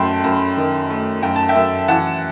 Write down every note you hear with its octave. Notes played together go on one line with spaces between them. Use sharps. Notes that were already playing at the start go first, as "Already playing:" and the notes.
Already playing: F#2 A3 G5 A5 B5 C6
F#2
D#3
A3
F#2 G5
A5
E5 G5
F#2
E3 F#5 A5